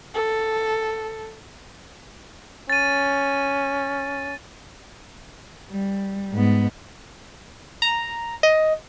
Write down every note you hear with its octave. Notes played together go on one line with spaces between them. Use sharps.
A4
C#4 A6 D#7
G3
G#2 B3
A#5
D#5